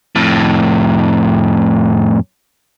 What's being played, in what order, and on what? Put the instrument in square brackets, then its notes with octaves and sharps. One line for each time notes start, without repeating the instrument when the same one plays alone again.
[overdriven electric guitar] F2 A2